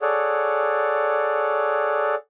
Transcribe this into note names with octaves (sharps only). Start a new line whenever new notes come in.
G#4 A4 C#5 D5 F#5